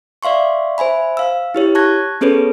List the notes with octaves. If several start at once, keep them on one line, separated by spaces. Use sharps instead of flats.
D5 E5 F5 C6 C#6
C5 E5 G#5 B5
F5 E6
E4 G4 C#5
A5 C#6 F#6 G#6 A#6
B3 C#4 G#4 A4 B4 C#5